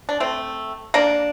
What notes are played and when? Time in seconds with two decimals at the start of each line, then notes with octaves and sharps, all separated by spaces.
0.09 D4
0.20 A3 C4
0.94 A#3 D4